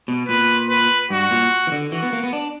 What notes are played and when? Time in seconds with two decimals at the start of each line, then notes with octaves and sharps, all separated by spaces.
0.08 B2
0.29 A#2 B4
0.70 B4
1.10 G2 F#4
1.31 A#2
1.67 E3
1.72 D3
1.92 E3 F#4
2.03 B3
2.13 A#3
2.23 B3
2.33 D4